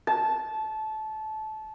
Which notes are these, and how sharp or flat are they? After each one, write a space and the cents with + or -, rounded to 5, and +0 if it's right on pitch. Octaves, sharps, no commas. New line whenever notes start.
A5 -20